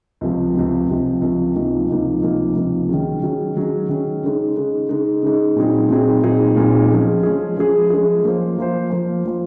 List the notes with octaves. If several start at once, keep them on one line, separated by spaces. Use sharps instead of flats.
C#2 C3 F3
C#2 C3 F3
C#2 C3 F3
C#2 C3 F3
C#2 C3 F3 A#3 D#4
C#2 C3 F3 A#3 D#4
C#2 C3 F3 A#3 D#4
C#2 C3 F3 A#3 D#4
D#3 F#3 C#4 G#4
D#3 F#3 C#4 G#4
D#3 F#3 C#4 G#4
D#3 F#3 C#4 G#4
C#3 G#3 D#4
C#3 G#3 D#4
C#3 G#3 D#4
C#3 G#3 D#4
A#2 F#3 C4 D#4 G#4
A#2 F#3 C4 D#4 G#4
A#2 F#3 C4 D#4 G#4
A#2 F#3 C4 D#4 G#4
F3 G#3 C#4 G#4
F3 G#3 C#4 G#4
F3 G#3 C#4 G#4
F3 G#3 C#4 G#4
F3 A#3 F4 C5
F3 A#3 F4 C5
F3 A#3 F4 C5
F3 A#3 F4 C5